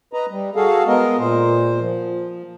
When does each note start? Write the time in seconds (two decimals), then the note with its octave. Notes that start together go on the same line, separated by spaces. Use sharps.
0.13 B4 D#5 A#5
0.30 G3
0.56 F#4 G#4 A4 F5
0.87 G#3 B3 A#4 D#5
1.19 A#2 C5
1.80 F3